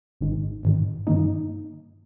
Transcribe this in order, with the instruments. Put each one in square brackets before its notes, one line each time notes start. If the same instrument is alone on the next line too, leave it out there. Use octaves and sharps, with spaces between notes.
[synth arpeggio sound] G#1 G#2 D#3
G#1 G#2 D#3
G2 D#3 A#3 D#4